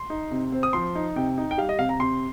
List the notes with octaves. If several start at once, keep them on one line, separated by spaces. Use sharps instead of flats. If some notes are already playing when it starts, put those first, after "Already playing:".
Already playing: C6
D#4
C3
C4
D#6
F3 C6
D#4
C3 G5
D#4
G5
G3 F5
D#5
C3 F5
A#5
C3 C6